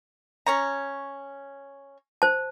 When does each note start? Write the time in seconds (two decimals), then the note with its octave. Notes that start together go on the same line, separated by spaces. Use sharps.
0.47 C#4 C#5 A#5
2.22 C5 A5